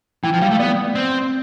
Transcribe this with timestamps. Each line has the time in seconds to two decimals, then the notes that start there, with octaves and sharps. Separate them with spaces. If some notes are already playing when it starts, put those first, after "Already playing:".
0.24 E3 G5
0.33 F3
0.42 G3 F5
0.51 A3
0.59 B3 D5
0.95 C4